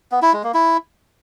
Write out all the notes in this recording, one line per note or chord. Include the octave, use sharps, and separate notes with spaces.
B3
E4
G#3
A#3
E4